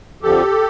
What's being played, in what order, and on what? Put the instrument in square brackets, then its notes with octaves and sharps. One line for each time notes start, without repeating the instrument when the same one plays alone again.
[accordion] F2 D3 F3 G4 A4